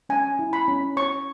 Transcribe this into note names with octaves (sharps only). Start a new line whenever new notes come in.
C#4 G#5
E4
B5
C#4
C#5 C#6